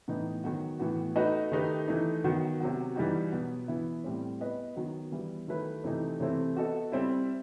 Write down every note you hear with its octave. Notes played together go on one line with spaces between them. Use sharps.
A2 E3 B3 D#4
D#3 F#3 B3 F#4
A2 E3 B3 F#4
A3 D#4 F#4 B4 D#5
D#3 A3 D#4 G4 B4
E3 A3 D#4
D#3 F#3 B3 F#4
C3 F#3 B3 F#4
E3 G3 D#4 F#4
B2 F#3 B3
E3 B3 E4
A2 G3 C4
B3 E4 B4 D#5
D#3 F#3 B3
E3 G3 B3 E4
D#3 F#3 A3 E4 B4
C3 E3 A3 D#4
C3 E3 A3 C4 E4
B3 F#4 A4 D#5
G3 C4 E4